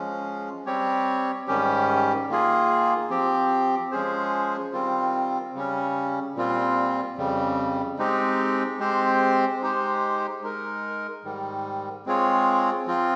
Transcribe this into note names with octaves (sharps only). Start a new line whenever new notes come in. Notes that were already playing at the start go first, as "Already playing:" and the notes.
Already playing: F3 G#3 C#4
G3 C4 G4 C#5
G#2 D#3 G3 C#4 G4
D#3 A#3 F4 G#4
F3 C4 G4
F3 G#3 C#4 G#4 C5
D#3 G3 C4 F4
C#3 G3 C#4
A#2 G3 C4 F4
F2 C#3 G3
G#3 C4 D#4 G4
G#3 C4 G4 C5
G#3 D#4 G4 C5
G#3 D#4 A#4
G#2 D#3 G3
G#3 C4 F4 G#4 C#5
F3 C4 F4